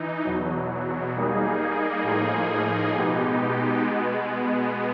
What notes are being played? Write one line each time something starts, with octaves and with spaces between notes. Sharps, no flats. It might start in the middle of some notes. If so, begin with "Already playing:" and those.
Already playing: E3 D#4
E2 B2 F#3
G3 A#3 D#4 G#4
A2 F3 A#3 D#4 G#4
B2 G#3 B3 D#4 G4
B2 G#3 B3